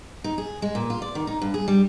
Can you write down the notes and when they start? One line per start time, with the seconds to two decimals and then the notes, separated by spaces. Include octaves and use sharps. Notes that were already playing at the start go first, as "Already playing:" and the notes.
0.24 D#4
0.38 G#4
0.62 G#3
0.75 A#2
0.90 F4
1.02 D5
1.15 D#3
1.27 D#4
1.42 G2
1.54 G#4
1.68 G3